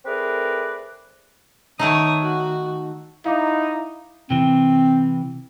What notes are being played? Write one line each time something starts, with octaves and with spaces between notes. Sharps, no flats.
A3 C4 G#4 A#4 B4 D5
D#3 A3 D#4 C#5 D#6
F#4
D#4 E4 F5 D6
C3 E3 C4